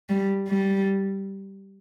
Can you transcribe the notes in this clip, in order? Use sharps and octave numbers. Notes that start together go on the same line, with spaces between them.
G3
G3